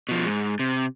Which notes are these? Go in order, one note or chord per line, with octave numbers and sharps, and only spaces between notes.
B2 F3
G#2
C3